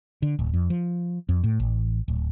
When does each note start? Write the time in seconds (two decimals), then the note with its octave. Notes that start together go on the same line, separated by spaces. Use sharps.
0.22 D3
0.39 D1
0.53 F2
0.70 F3
1.29 F2
1.44 A2
1.60 A1
2.08 D1